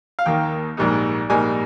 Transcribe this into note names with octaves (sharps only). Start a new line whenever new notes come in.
F5
D#2 D#3 A#3 G5
A#1 G#2 G3 A#3 D#4
A#1 G#2 G3 A#3 D#4 G#5